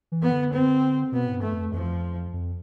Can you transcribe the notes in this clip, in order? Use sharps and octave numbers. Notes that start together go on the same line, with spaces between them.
E3
B3
D3
C4
B2 B3
A2
G2
A3
F2
F2 F3
F2